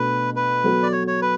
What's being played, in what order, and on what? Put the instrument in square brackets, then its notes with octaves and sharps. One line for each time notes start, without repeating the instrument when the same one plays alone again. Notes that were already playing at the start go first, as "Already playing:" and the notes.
Already playing: [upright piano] B2 A3 D4 F#4 [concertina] B4
[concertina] B4
[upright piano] F#3 B3 F#4 A4
[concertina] D5
C#5
C#5
B4